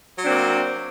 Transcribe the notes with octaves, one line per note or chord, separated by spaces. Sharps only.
F#3 A#3 C4 D4